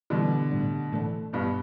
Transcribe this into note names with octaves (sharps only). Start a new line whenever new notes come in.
B2 D3 E3 G3 B3 D4
A2 G3 D4
A2 E3 A3 D4 A4
G2 B2 G3 B3 D4